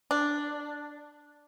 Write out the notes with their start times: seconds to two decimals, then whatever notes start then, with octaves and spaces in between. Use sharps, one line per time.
0.11 D4